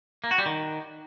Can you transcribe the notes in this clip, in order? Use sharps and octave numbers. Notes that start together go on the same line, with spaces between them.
A#3
F#4
G3
D#3